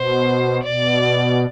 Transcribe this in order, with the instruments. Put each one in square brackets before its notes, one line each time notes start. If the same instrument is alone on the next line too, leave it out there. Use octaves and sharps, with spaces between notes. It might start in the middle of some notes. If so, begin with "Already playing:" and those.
Already playing: [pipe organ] B2 [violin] C5
[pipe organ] B2 [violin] D5